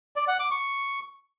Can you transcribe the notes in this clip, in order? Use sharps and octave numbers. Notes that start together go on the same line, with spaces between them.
D5
F#5
D6
C#6